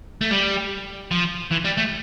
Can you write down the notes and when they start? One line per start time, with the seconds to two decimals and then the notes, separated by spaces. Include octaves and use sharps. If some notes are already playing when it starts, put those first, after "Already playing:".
0.21 A3
0.31 G3
1.11 F3
1.51 E3
1.65 G3
1.78 A3